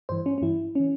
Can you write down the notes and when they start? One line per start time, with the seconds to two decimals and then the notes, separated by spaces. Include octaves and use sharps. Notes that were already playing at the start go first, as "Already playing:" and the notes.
0.09 G2 E3 C5
0.26 C#4
0.38 C#4
0.42 G2 E3 E4
0.75 E3 C#4